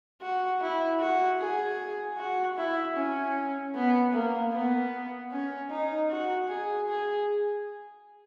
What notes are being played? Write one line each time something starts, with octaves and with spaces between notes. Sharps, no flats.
F#4
E4
F#4
G#4
F#4
E4
C#4
B3
A#3
B3
C#4
D#4
F#4
G#4
G#4